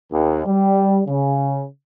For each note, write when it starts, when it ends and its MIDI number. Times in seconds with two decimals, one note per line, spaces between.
0.11 0.45 39
0.46 1.00 55
1.07 1.64 49